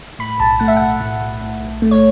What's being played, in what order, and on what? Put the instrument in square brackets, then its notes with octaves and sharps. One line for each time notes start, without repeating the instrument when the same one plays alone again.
[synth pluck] A2 B5
B1 A5
A3 F#5
E5
B1 F#5
A2
B1
A2
B1
A3
C#5